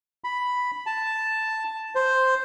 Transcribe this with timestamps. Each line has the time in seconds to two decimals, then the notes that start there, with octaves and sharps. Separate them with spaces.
0.24 B5
0.86 A5
1.95 C5